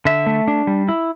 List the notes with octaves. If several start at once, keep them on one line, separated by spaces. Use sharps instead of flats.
D3 E5
A3
D4
G3
E4